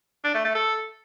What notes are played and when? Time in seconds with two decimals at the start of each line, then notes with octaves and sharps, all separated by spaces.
0.24 D4
0.34 A3
0.45 A3
0.55 A4